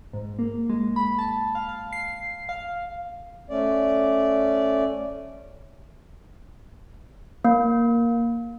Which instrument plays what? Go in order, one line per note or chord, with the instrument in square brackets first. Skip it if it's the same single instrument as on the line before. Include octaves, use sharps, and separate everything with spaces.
[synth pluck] G#2
A#3
G#3
B5
A5
F5
F5
C7
F5
[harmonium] A3 C#4 D5
[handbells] A#3